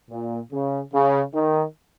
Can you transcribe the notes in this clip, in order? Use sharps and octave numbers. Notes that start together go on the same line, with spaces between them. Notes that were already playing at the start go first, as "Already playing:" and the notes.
A#2
C#3
C#3
D#3